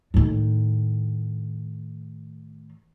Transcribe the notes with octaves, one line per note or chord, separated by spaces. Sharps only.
A2 D#3